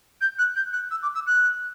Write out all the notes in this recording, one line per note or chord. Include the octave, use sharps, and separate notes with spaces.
G6
F#6
G6
F#6
E6
D6
E6
F#6